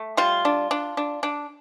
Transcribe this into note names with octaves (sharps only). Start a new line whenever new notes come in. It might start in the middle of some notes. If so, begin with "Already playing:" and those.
Already playing: A3
G3 F4
D4
D4
D4
D4